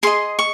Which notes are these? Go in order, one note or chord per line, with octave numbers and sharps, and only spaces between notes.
G#4 D#5 C6
C#6